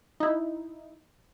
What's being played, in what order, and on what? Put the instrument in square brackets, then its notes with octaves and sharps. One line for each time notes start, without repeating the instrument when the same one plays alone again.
[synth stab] D#4 E4